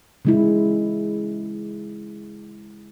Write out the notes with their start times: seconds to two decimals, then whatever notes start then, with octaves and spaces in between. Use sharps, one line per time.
0.25 C#3 G#3 E4